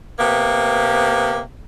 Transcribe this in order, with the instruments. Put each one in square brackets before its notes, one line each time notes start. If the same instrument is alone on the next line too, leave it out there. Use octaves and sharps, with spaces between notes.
[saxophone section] C3 A#3 B3